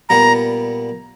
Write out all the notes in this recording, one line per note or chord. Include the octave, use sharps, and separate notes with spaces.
A#2 G3 B3 A#5